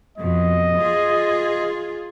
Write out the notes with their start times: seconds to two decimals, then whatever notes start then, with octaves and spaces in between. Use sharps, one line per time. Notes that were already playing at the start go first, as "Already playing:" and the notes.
0.18 F2 B2 D#5
0.77 F4 G#4